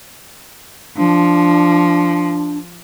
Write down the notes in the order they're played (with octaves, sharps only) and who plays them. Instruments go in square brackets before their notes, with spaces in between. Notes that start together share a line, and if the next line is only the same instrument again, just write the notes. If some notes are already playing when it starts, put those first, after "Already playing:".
[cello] F3 [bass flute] D4